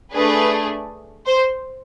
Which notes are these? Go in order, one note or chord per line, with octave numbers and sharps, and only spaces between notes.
A3 D4 G#4 B4
C5